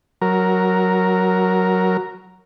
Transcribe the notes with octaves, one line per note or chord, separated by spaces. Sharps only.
F#3 A#4